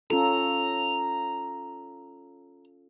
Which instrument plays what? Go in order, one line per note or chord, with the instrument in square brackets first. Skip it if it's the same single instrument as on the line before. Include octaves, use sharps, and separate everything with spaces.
[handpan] C#4 F4 A4 [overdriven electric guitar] A#5